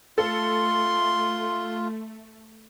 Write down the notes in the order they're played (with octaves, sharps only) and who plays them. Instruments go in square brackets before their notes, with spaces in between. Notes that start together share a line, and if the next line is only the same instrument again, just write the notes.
[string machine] A3 [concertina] F4 [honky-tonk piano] A4 [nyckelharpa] C6